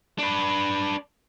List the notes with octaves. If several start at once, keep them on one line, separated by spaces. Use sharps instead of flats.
D4 B4